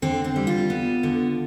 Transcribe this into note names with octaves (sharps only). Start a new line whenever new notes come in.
D3 C4
C4
G3
F4
B3
D3